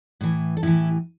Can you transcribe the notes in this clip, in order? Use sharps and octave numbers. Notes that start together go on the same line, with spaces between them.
A2 E3
A4
A2 E3 E4 G4